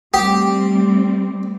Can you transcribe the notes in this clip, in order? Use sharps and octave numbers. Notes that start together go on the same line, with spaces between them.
G3 A3 C4 G4